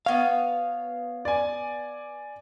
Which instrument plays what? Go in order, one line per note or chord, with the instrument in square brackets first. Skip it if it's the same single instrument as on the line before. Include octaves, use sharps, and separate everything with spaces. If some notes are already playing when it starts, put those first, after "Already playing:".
[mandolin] B3 C#5 [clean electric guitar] F5
[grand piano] D5 G#5